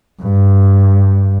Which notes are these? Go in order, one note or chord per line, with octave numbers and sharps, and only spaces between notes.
G2